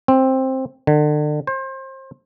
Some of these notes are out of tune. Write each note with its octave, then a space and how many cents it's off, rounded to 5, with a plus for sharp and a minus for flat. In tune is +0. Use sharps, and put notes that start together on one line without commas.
C4 +10
D3 +35
C5 +30